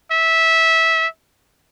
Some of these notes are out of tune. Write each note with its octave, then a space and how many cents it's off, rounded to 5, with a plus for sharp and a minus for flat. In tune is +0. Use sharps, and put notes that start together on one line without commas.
E5 -15